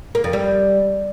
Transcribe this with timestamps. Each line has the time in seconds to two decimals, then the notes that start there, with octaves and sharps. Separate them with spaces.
0.15 A#3
0.24 F2
0.33 G3